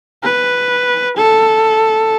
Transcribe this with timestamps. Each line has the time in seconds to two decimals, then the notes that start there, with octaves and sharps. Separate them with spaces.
0.24 B4
1.17 A4